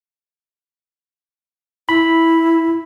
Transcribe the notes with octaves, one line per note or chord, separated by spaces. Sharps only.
E4 B5